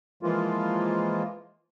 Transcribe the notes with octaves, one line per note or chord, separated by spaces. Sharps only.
E3 F3 G#3 A#3 F4